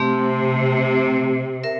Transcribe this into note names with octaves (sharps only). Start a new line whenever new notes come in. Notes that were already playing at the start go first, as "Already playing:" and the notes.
Already playing: C3 A3 C4 G4
A#4 E5